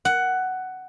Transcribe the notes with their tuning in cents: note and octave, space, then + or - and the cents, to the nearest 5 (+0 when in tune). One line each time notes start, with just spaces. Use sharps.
F#5 +10